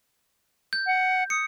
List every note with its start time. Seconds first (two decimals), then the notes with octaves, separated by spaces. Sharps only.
0.73 G6
0.86 F#5
1.30 D#6 C#7